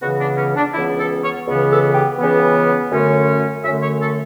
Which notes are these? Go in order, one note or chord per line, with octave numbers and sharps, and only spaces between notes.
C#2 C#3 E3 B3 F#4
D4
C#4
D4
C#2 C#3 E3 B3 E4
A4
C#5
C#2 C#3 E3 B3
A4
G4
C#2 C#3 E3 B3
F#2 D3 A3 C#4
F#2 D3 A3 C#4 E5
C#5
A4